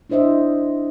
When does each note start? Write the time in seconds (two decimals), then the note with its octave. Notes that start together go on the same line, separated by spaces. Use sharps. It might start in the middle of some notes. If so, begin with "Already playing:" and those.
0.10 D4 E4 C5 D#5 E5